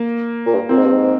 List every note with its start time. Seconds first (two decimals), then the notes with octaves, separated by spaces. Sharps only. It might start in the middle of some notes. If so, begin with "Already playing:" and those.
Already playing: A#3
0.45 A#2
0.54 G2
0.69 A#2 C4
0.77 G#2
0.85 G2
0.92 G#2